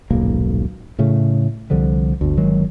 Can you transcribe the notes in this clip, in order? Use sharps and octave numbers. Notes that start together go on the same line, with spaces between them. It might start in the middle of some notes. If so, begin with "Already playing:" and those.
D#1 B1 G#2 A#3
A2 C#3 A3
C2 D3 F3 G3
G1 D2
G1 D#3 F#3 G#3